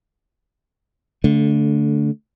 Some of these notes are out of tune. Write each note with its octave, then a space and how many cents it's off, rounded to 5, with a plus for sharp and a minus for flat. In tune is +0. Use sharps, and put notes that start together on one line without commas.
D3 -20 A3 +0